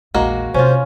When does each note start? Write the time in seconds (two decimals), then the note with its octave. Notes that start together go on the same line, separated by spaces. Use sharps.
0.14 A#1 E2 G#3 A#3 F#4
0.54 C3 C4 C#4 F4 C5